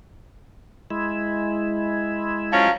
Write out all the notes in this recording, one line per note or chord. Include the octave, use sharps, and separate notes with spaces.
G#3 E4
F3 F#3 C#4